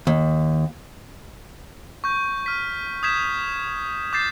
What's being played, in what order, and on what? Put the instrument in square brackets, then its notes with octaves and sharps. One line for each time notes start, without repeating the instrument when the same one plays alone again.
[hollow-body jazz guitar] D#2
[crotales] C#6 G6
F6 B6
D#6 G6 G#6 B6 E7
D6 G6 A6 C7